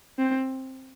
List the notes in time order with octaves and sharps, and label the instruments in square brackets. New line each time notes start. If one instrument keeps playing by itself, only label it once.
[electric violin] C4